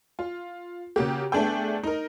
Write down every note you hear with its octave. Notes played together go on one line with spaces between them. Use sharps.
F4
C#3 A#3 F#4 G4
A3 B3 D4 G#4 G5
D#4 A#4